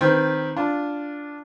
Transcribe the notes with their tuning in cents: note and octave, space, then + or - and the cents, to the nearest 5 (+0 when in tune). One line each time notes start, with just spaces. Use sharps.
D#3 +0 C4 +0 B4 -10
D4 -5 F4 +0